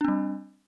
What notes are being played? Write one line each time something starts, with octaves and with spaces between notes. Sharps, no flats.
G3 C4 D4